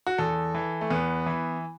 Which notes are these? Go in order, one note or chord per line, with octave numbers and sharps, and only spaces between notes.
F#4
E2 A4
E3
A3
E2 B3
E3